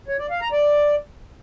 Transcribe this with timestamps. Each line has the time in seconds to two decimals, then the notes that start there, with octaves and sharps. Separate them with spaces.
0.08 C#5
0.19 D5
0.30 F5
0.41 A#5
0.52 D5